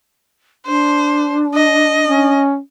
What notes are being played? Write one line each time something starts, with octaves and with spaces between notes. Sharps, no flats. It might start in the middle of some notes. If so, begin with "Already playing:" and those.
D4 C5
D#5
C#4